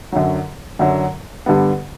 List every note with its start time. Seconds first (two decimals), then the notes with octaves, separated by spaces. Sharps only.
0.12 F#2 D3 F#3
0.79 F#2 D3 F#3
1.46 G2 D3 G3 B3